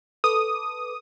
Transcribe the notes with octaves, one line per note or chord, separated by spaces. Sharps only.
A4 B4 D6 D#6